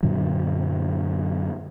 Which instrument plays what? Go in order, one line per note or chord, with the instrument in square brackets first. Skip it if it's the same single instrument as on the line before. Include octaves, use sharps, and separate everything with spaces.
[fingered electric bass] F#2 A#2 D3 F#3